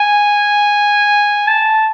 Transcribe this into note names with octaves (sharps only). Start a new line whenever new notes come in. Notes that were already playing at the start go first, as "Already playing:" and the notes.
Already playing: G#5
A5